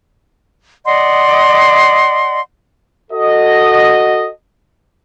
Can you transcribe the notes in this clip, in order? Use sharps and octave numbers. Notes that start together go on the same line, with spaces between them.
D5 D#5 F#5 C6
F#4 A4 D#5